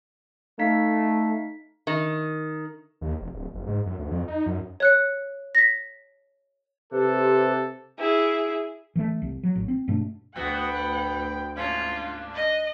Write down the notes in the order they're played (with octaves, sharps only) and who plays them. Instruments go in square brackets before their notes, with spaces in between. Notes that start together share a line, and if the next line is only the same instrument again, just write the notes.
[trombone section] A3 [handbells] D#4 F5 B6
[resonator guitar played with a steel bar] D#3
[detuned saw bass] D#2
F1
D1
F#1
G#2
F#2
D2
F2
D#4
F#2
[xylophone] C#5 F#6 C#7
A#6 B6
[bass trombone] C3 [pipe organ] G4 B4 C5 [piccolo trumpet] A4
[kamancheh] E4 G#4
[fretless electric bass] E3 G#3 A3
C2
F#3
A1
C4
G2 B2 A3 D4
[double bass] D2 [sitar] A2 B3 F#4 [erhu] F#5 [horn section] G5
[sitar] G#2 A#3 C#4 [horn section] D4 [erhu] F4
[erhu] D#5